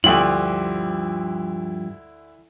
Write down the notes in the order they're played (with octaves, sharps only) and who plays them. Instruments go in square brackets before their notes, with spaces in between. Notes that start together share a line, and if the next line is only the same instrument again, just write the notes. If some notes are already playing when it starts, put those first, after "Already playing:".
[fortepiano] D2 F4 [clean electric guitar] G2 F3 G4 [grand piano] E4 [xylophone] F#7